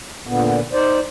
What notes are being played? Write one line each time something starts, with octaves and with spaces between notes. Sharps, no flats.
A#2 D3 B3
D#4 C5 D5